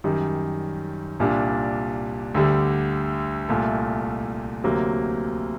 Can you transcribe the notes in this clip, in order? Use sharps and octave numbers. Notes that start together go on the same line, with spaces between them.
F#2 D#3 G3
C2 A#2 G3 D4
D2 D3 G3
C2 A#2 A3
D2 C3 F#3 A#3